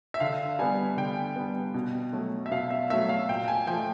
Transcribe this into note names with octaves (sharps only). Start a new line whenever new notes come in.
E5
D3 F5
G3 B3 G#5
D3 G5
G3 B3
B2
F#3 A3
E5
B2 F5
E5
F#3 A3 E5
F5
A#2 G5
G#5
F3 A3 G5